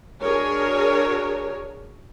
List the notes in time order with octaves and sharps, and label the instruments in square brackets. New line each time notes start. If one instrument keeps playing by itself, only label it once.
[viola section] D4 F#4 G#4 A#4 C#5